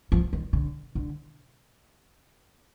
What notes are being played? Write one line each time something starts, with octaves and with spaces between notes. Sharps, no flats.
F3
D#3
D3
D3